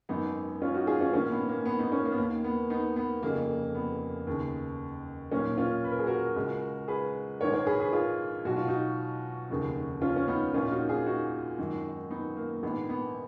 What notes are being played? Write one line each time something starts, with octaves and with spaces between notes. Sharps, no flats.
G#1 F#2 D#3 B3 D#4
C#4 F4
D#4 F#4
F4 G#4
C#4 F4
A#1 G#2 D#3 A#3 C#4
B3
A#3
B3
B3 D#4
A#3 C#4
A#3
B3
D#2 D#3 A#3
B3
B3 D#4
B3
F1 F2 C#3 A#3
B3
D#2 C#3
B1 A#2 A#3 C#4
C#4 F4
B4
A#4
G#4
F#4 A#4
C#2 C#3
G#4 B4
A#1 G#2 D#3 A#4 C#5
A#4 C#5
G#4 B4
G#4 B4
F4 G#4
B1 B2 F#4
F4
D#4 F#4
F1 D#2 C#3
C#4 F4
C#4
B3 D#4
A#1 A#2 C#4 F4
F4
D#4 F#4
F4 G#4
D#4 F#4
G#1 F#2 D#3
B3 D#4
A#3
A#1 G#2 D#3 B3
B3